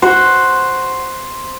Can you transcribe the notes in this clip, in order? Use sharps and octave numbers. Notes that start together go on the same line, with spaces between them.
F#4 C5